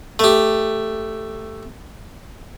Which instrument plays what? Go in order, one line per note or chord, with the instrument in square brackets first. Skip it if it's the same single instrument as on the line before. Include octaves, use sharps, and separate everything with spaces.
[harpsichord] A3 G4